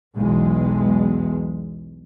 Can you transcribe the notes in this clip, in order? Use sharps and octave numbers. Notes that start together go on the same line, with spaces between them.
B1 E2 G#3